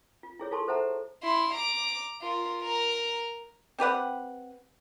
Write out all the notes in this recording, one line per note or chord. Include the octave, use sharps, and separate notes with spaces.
F4
E4 G#4 C#5 D6
F4 G#4 A4 A5 C6 C#6
A4 C5 E5 F#5 A5 A#5
E4 C6
A#5 D6
F4 A#4
A#4 A#5
C4 G4 B4 F#5